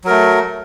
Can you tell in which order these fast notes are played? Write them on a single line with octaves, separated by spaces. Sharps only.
F#3 A#4 A3